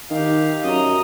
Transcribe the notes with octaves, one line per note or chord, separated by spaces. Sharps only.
D#3 G4 F5
F#2 D#5 A#5